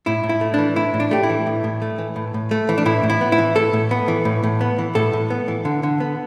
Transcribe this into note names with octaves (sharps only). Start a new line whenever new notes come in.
A2 E4
A2
E4
A3
E3 D4
A2 E4
A2
D4
A3 G4
E4
E3
A2
A2
A3
E3
A2
A2
A3
E3
D4
A2 E4
A2
E4
B3
E4
E3
A2 A4
A2
B3
E3
A2
A2
B3
E3
A2 A4
A2
B3
E3
D3
D3
B3